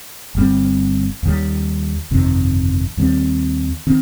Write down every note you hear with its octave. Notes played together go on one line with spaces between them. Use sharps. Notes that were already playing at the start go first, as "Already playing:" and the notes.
G1 G2 G3 C4
D#2 D#3 G3
G1 F2 C3 D#3
D#2 D#3 G3 C4
D#3 C4